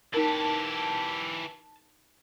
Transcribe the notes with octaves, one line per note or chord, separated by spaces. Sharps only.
E3 D#4 G4 A#4 A5